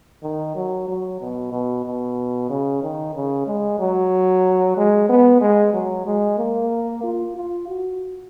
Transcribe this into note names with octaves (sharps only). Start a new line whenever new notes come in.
D#3
F#3
F#3
B2
B2
B2
C#3
D#3
C#3
G#3
F#3
G#3
B3
G#3
F#3
G#3
A#3
F4
F4
F#4